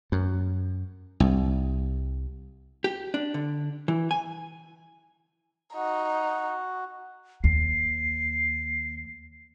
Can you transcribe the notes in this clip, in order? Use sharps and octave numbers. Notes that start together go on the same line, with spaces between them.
F#2
C2
G4
D4
D3
E3
G#5
D#4 F#4
D#2 C7